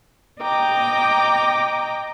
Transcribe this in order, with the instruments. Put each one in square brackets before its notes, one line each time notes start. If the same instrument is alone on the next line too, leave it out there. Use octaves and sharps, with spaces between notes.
[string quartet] D#5 G5 A#5 D6